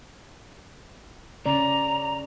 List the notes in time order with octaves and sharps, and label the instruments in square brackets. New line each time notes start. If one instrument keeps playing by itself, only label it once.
[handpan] C#3 C#4 D5 [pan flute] A#5